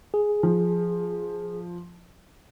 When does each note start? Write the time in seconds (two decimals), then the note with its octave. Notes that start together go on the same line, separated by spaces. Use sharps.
0.14 G#4
0.43 F3